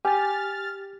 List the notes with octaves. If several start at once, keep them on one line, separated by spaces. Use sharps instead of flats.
G4 G#5 F6 A6